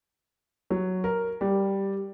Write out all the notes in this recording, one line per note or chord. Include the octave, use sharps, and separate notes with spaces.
F#3
A#4
G3